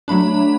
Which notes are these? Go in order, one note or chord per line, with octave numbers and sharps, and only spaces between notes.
F#3 A3 D4 B5